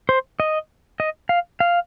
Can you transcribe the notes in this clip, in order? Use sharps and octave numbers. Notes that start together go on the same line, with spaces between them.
C5
D#5
D#5
F5
F5